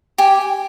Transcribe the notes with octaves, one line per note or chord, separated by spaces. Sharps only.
G4 G#5